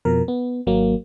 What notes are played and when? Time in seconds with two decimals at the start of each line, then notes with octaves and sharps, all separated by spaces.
0.05 F2 B2 F3 A#4
0.28 B3
0.66 G#1 F#3 A#3